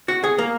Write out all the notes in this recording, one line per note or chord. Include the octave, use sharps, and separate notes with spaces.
F#4
G#4
A#3